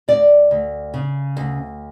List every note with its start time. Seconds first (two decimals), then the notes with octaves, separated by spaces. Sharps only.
0.08 D2 D5
0.51 D2
0.94 C#3
1.37 D2